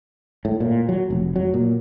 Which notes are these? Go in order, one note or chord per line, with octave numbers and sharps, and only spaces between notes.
A2
A#2
F#3
F1
F#3
A#2